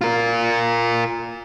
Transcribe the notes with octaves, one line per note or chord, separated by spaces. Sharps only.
F4 A#4